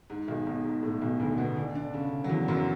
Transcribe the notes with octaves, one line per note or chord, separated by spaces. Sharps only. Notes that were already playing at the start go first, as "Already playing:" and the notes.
G#2
B1 B2
B1 B2
G#2
A2
B1 B2
D2 D3
B2 B3
D3 D4
D3 D4
C#3 C#4
F#3
E2 E3
F#2 F#3